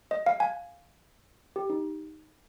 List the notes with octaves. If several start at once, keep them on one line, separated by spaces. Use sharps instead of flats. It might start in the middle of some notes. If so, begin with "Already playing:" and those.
D#5
F5
G#5
G4
D#4